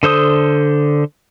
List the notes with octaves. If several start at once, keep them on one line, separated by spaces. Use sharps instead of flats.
D3 A4 C5 D#6